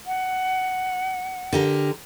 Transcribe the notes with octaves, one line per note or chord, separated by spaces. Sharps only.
F#5
D3 G4 A#4